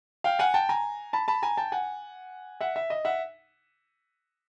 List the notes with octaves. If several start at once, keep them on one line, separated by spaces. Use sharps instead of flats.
F5 G5
F#5 G#5
G5 A5
G#5 A#5
A5 B5
A5 B5
G#5 A#5
G5 A5
F#5 G#5
E5 F#5
E5
D#5
E5 F#5